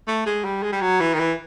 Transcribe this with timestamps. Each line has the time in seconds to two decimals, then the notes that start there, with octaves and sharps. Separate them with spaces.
0.07 A3
0.26 G#3
0.44 G3
0.63 G#3
0.72 G3
0.81 F#3
1.00 E3
1.14 D#3
1.19 E3